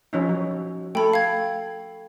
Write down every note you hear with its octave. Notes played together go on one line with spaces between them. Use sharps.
F3 C#4 D#4
F#3
A3 A4 G5 B5
F5 G#6